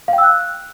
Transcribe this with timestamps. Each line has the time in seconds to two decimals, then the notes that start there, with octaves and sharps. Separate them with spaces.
0.08 F5
0.13 G5
0.18 E6
0.23 F#6